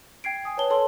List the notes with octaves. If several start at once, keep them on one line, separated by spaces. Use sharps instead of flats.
G5 G#6 C7 D7
G#5 D#6
B4 C#5 A5 G7
A4 C#5 A5 C6